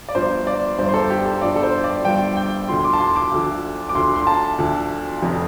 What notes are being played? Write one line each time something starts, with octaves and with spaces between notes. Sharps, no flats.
D5
G1 G2 F3 C5
D5
G1 G2 F3 C5
C5
A4
G4
A4
G1 G2 F3 D5
A4
C5
D5
G1 G2 F3 G5
G5
D2 D3 F3 C6
C6
D6
A5
C6
D6
D2 D3 F3
D6
D2 D3 F3 C6
C6
A5
D2 D3 F3
F1 F2 F3